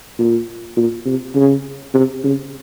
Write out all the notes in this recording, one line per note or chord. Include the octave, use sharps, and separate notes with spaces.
A#2
A#2
C3
C#3
C3
C#3